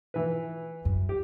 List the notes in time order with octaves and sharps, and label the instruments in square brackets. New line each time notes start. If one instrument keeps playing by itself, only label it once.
[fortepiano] E3 B4
[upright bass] F#2
[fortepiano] G4